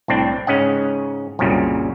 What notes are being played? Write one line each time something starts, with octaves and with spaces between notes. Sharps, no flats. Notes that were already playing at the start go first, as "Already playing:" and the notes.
C2 A2 C4 D4
G#2 C#3 C#4 D#5 F#5
C2 F#2 A#2 C#3 G3